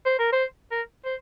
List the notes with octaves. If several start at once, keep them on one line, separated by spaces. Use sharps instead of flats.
C5
A#4
C5
A#4
C5